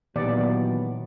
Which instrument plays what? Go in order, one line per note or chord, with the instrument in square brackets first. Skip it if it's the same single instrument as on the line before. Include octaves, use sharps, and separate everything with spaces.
[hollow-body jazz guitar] D#2 [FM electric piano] A#2 [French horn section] E3 F#3 B3 [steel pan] D5